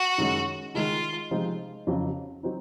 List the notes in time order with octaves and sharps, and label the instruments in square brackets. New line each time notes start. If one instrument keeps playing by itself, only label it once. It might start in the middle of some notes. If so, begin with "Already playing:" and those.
Already playing: [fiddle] F#4
[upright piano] F#2 D#3 G#3 C#4
[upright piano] D#3 G#3 D#4 [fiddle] F4
[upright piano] C3 F3 G#3 C4 D#4
F2 C#3 F#3 C4
F#3 C4 D#4